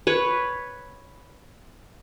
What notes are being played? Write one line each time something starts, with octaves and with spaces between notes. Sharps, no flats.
B4 C#5